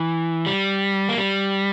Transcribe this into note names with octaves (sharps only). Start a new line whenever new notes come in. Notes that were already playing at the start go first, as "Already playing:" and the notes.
Already playing: E3
G3
A#3
G3